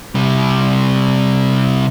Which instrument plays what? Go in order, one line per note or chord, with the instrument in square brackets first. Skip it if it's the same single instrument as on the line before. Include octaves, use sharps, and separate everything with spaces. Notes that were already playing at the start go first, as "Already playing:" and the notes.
[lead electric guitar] C3 G3